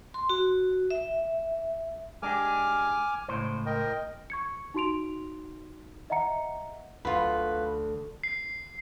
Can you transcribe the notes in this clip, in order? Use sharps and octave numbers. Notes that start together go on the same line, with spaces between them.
C6
F#4
E5
G#3 D4 G4 G#5 D6 F6
C#2 A2 C5
A#4 D#5 G5
C#6 G#6 C#7
D#4 F#4 C6 D7 F7
D#5 E5 F#5 A#5 C#7
D2 F4 B4
C7